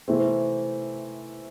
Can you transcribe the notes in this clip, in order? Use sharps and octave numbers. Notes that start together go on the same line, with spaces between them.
C3 E3 A3 C4